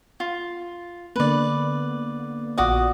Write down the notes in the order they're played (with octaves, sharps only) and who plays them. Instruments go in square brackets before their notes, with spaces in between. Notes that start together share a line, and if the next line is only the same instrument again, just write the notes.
[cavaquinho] F4
[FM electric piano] D3 A#3 B3 [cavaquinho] B4 D5
[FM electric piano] A#1 F4 D5 [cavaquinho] F#4 D6 D#6